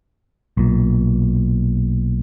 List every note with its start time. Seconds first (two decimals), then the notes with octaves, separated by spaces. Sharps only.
0.57 B1 A#2